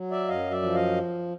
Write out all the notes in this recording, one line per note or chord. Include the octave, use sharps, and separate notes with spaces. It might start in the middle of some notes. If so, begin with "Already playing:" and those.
Already playing: F#3
D5 E5
F#2 D#5 F5
D5 E5
F3
D#5 F5